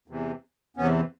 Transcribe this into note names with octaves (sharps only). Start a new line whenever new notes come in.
E2 C3 E3
E2 C3 E3 B3 C#4